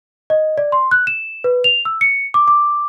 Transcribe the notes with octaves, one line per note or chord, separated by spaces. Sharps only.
D#5
D5
C6
F#6
E7
B4
F7
E6
C#7
D6
D6